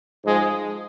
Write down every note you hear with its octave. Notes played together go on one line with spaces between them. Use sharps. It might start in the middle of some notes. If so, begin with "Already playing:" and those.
G#2 F3 G#3